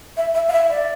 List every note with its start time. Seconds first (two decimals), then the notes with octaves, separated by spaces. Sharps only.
0.17 E5
0.34 E5
0.49 F5
0.53 E5
0.70 D5